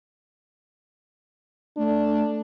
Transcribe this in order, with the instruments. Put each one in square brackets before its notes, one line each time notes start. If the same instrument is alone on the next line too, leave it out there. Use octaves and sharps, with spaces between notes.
[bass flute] A3 [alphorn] D4